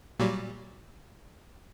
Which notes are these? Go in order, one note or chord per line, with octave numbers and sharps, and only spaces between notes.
A#2 F#3 G3